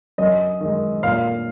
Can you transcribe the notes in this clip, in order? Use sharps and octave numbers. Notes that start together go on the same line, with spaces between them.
F#2 D#5
D#3 G#3
A#2 F5